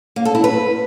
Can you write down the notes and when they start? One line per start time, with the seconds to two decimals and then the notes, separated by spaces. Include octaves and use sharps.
0.16 A#3
0.25 A4
0.35 E4
0.44 B4